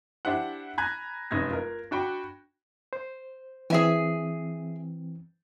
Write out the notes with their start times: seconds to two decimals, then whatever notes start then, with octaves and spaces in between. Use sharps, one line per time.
0.25 D4 E4 G4 C5 F#5
0.78 G#5 A#5 B5 F#6 G#6
1.31 F1 F#2 D#4 G#6 A#6
1.51 F4 A#4
1.91 D4 F#4 G5 B5
2.93 C5
3.70 E3 C4 G#4 E5 G#5